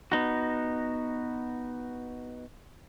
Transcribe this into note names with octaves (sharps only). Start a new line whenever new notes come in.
B3 D#4 F#4